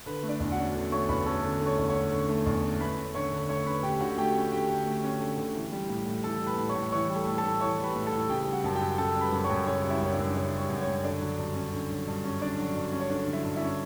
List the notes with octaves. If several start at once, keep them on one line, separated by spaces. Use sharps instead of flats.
D3 B4
A3
D4 D5
E2
F#4 F#5
C#4
D3
A3 C#5 C#6
E2 B4 B5
C#4 A4 A5
D3
A3
C#5 C#6
E2
C#5 C#6
C#4
D3
A3
E2
C#4
A3 B4 B5
C#4
D3 C#5 C#6
D3
A3 C#5 C#6
C#4 B4 B5
D3 G4 G5
D3 F#4 F#5
A3 G4 G5
C#4
D3 G4 G5
D3
A3
C#4
D3
D3
E3
G3
A2
A2
E3 A4 A5
G3
B4 B5
A2
C#5 C#6
A2
E3 C#5 C#6
G3
A4 A5
A2
A4 A5
A2
E3 C#5 C#6
G3
B4 B5
A2
A4 A5
A2
C#3 G4 G5
G3
F#4 F#5
F#2 A5
G4 G5
F#2
C#3 A4 A5
G3
B4 B5
F#2
C#5 C#6
F#2
C#3 C#5 C#6
G3
E4 E5
F#2 C#5
D4 D5
F#2
C#3 C#5
G3
C#5
F#2
C#5
F#2
D3 D4 D5
F#3
G2
C#4
D3
F#3
G2
C#4
D3 D4 D5
F#3
G2
C#4
C#5
D3 D4 D5
F#3
E4 E5
G2
E4 E5
C#4